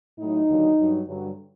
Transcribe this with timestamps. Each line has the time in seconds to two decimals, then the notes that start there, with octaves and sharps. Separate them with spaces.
0.19 A2 F#3 D#4
0.48 D#2 D3 F#3
0.77 G2 F#3
1.07 G2 D3 F#3